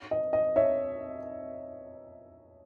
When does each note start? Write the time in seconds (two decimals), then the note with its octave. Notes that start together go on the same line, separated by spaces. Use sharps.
0.11 D#5
0.33 D#5
0.56 C#5 E5